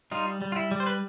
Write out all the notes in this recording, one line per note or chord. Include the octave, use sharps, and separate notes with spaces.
G3 D#4 F4
G3
F4
E4
G3
C5
B4